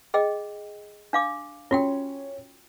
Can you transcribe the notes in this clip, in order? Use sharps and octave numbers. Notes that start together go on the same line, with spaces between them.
G#4 D#5 G5
D4 F5 D6
C#4 F4 F#4 G5